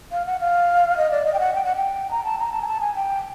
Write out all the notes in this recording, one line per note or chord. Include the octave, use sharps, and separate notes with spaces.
F5
F#5
F5
D#5
D5
D#5
G5
F#5
G5
F#5
G5
A#5
A5
A#5
A5
G#5
A5
G#5
G5